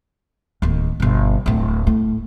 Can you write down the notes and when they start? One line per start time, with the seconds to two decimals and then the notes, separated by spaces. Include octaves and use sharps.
0.62 D1 D#2
1.00 G1 B2
1.46 D1 A2
1.87 A2